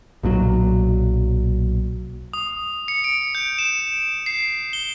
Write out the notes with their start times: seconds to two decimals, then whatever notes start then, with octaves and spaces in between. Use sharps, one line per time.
0.23 B1 A#2 D3 F#3
2.33 D#6
2.88 C#7
3.04 D7
3.35 G6
3.59 E7
4.26 C7
4.73 G7